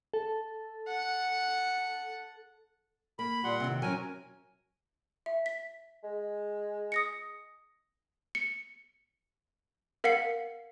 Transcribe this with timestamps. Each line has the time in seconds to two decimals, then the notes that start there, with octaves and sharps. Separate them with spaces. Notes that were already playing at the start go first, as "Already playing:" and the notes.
0.14 A4
0.88 F#5
3.19 A#3 B5
3.44 A#2 G3 F#5 C6
3.60 C3 D#3
3.82 F#3 C#4 A#4 G#5
5.26 E5
5.46 B6
6.04 G#3
6.92 D#6 A#6 C#7
8.35 C#7
10.04 A#4 F5 F#5 C7 C#7